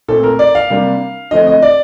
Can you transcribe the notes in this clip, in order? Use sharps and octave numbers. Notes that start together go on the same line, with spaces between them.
A#2 A3 C4 A4
A#4
D5
F5
C3 G3 A#3 D4
D3 F3 A3 C4 D#5
D#5
D5